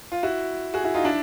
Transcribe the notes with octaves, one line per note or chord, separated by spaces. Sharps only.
F4
E4 F#4
F#4 G#4
E4 F#4
D#4 F4
D4 E4